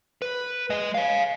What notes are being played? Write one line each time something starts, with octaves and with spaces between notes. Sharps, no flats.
B4
G#3 D#5
C#5 F5